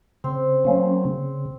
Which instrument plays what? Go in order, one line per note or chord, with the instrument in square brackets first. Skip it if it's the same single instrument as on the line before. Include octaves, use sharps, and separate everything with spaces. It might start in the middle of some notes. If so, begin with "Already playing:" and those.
[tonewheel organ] C#3 [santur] C4
[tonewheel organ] F#3 A#3 C#4
C#3